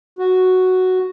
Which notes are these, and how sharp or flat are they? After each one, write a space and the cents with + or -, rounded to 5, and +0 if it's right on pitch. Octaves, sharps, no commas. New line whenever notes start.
F#4 +0